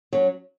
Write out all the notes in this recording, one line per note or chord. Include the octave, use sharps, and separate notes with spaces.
F#3 C#4